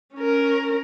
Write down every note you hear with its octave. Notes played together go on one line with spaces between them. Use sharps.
C#4 A#4